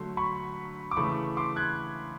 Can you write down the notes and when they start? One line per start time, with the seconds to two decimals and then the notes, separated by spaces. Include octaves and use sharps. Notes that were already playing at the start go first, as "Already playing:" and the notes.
Already playing: D3 F#3 A3 C6
0.17 B5 C#6
0.91 D6
0.97 C#3 E3 A3 B5 C#6
1.37 C6 D6
1.56 F#6 G#6